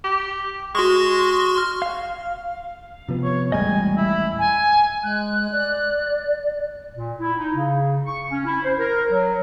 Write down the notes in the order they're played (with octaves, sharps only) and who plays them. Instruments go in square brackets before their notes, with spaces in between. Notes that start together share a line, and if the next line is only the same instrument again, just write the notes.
[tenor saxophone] G4
[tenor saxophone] G#3 [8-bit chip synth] F#4 C6 C#6
[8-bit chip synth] F6
[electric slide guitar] F5
[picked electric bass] C3 F3 B3
[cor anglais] C#5
[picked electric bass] D#1 A1 G#3 [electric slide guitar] G3 D#5 [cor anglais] G#5
[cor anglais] E4
[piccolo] G#5
[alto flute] G#3 [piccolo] F#6
[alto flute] D5
[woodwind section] A#2
E4
D#4
C#3
C#6
C#4
E4
C5
A#4
F#3